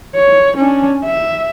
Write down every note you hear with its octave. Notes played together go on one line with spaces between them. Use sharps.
C#5
C#4 D4
E5